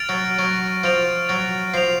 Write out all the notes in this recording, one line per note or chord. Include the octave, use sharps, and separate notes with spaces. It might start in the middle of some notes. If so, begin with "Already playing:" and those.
Already playing: F6 A6 D7 F7
F#3
F#3 C#6
F3 F6 A6 D7 F7
F#3 A6
F3 C7 F7